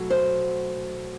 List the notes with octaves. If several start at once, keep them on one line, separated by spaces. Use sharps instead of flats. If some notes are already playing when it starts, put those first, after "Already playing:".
Already playing: B2 F#3 A3
C5